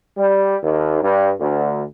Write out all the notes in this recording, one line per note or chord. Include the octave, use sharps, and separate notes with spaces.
G3
D#2
G2
D2